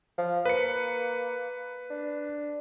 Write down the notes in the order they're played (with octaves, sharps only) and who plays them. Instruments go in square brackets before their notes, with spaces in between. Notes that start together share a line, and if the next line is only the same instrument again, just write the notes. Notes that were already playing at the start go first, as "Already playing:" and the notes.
[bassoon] F3
[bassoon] A#3 [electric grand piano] B4 C#7
[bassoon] D4